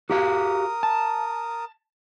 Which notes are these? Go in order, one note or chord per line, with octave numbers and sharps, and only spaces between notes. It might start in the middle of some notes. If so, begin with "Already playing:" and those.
F#4 G4 A#4 F5 D#6
A5